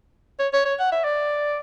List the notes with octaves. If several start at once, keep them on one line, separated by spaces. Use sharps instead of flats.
C#5
C#5
C#5
F#5
E5
D5